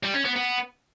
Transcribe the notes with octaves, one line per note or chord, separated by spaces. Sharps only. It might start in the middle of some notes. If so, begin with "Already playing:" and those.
G3
C#4
B3
B3